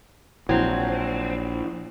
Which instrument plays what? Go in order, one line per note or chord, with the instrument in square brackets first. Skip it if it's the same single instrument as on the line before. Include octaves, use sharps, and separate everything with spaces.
[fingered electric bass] A#1 [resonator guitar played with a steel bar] F#3 C4 [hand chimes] E4